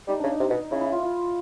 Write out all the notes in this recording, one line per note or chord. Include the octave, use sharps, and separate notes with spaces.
G3 D#4
C#3 D4
D#4
C3
B2
C#3 E4
E4
F4
F4